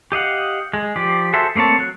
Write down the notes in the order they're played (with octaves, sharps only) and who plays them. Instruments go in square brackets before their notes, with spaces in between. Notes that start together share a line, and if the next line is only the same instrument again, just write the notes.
[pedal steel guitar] G4 D#5 F5 F#5
G#3
F3 G4 D5
F#4 G#4 A4 C5 E5
A3 A#3 C4 C#5 A5
F#3 F#6